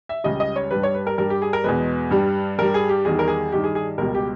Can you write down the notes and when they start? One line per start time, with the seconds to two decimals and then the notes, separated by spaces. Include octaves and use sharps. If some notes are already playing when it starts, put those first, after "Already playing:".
0.09 E5
0.24 C#2 C#3 G3 D#5
0.40 D#5
0.56 C#5
0.71 G2 G3 B4
0.83 C#5
0.95 B4
1.07 A#4
1.18 G2 G3 A#4
1.30 G4
1.42 G#4
1.53 A#4
1.64 E2 B2 G#3 B4
2.11 G2 G3
2.58 G2 G3 A#4
2.74 G#4
2.89 G4
3.05 E2 D#3 G3 G#4
3.19 A#4
3.28 G#4
3.52 G2 D#3 G3 G4
3.64 G#4
3.75 G#4
3.98 C#2 B2 G3 A#4
4.15 G4